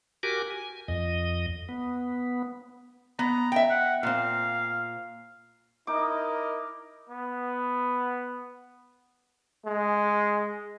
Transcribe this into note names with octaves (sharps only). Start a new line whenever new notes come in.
F#4 G4 A#4 G#5 D6
G#5
F2 D#5
B3
B3 A#5
E5 G5
F#5
A#2 C4 F5
D#4 E4 A#4 D#5 D6
B3
G#3